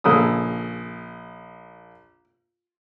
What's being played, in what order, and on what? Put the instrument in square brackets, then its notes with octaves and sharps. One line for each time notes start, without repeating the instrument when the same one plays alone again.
[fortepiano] A#1 C#3 A4 D#6